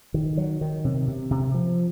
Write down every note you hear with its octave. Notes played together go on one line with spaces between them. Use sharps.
D#3
F#3
D#3
C3
C3
C3
F3